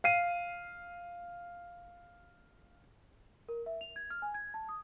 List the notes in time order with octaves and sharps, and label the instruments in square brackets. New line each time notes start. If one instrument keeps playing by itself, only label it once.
[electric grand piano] F5 C7 D#7
[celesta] A#4
E5
F7
G#6
F6
G#5
G#6
A5
D#6